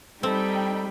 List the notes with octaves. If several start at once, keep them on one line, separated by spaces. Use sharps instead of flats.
G3 C4 D#4 A4 G5 B5